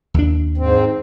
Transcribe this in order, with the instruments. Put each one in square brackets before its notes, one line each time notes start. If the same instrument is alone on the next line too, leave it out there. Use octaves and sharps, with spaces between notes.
[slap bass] D#2 D4
[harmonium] G#2 C4